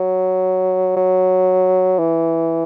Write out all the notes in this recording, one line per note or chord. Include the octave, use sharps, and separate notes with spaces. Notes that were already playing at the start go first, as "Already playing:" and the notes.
Already playing: F#3
F#3
E3